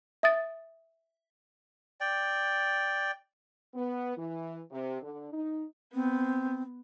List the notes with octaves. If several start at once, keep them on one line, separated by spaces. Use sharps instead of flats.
E5 D#6 A6
D5 G5
B3
E3
C3
D3
D#4
B3 C4